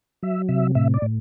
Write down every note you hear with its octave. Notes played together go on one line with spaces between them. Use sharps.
F#3 E5
C3 E5
A2 E5
D5
A2